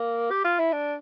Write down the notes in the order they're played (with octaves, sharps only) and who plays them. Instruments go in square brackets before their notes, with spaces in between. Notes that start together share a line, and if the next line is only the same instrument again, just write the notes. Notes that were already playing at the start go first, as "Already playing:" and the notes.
Already playing: [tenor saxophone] A#3
G4
F4
E4
D4